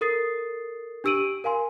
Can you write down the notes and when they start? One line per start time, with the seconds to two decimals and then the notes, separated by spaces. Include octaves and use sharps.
0.01 A4 A#4 D#6 A6 C7
1.04 D4 G4 E6 D7 D#7 F#7
1.44 A#4 F5 G#5 C6